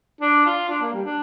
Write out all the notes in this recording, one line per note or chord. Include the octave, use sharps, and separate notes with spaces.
D4
F4
D4
A#3
G3
D4